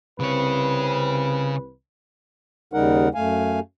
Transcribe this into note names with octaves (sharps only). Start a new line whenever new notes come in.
C2 C#3 C4 B4 C#5
D#2 C#3 G3 D#4 A#4 F#5
F#2 A3 F5 G#5